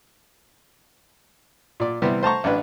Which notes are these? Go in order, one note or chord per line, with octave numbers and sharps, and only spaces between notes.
A#2 D5
C3 E3 G3 B3
C5 A5 A#5 C#6
A1 D4 B4